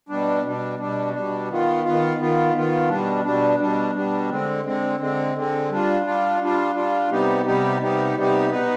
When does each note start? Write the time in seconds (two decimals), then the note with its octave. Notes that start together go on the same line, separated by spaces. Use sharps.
0.09 B2 G3 D4
0.43 B2 G3 D4
0.79 B2 G3 D4
1.14 B2 G3 D4
1.49 D#3 B3 F4
1.84 D#3 B3 F4
2.19 D#3 B3 F4
2.55 D#3 B3 F4
2.89 B2 G3 D4
3.24 B2 G3 D4
3.59 B2 G3 D4
3.95 B2 G3 D4
4.30 D3 G#3 C4
4.65 D3 G#3 C4
4.99 D3 G#3 C4
5.35 D3 G#3 C4
5.70 G3 D4 F4
6.05 G3 D4 F4
6.41 G3 D4 F4
6.75 G3 D4 F4
7.11 C3 G3 B3 D#4 G4
7.45 C3 G3 B3 D#4 G4
7.81 C3 G3 B3 D#4 G4
8.16 C3 G3 B3 D#4 G4
8.51 B2 B3 D#4 B4